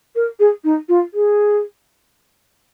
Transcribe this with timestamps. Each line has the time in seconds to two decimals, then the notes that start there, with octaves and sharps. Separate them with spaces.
0.15 A#4
0.40 G#4
0.64 D#4
0.89 F4
1.14 G#4